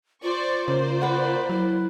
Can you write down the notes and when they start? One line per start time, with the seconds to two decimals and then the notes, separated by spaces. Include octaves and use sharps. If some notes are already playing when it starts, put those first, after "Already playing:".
0.23 F4 C5 D5 C#6
0.68 C#3 A#3 C5 D5
1.01 B4 F#5
1.49 F#3 E4